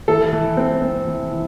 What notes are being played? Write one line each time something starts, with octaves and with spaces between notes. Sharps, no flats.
E3 A4
E3
C4
C4
E3
E3